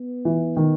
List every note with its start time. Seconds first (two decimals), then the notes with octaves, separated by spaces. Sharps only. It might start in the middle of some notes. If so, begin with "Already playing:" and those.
Already playing: B3
0.25 E3
0.57 D#3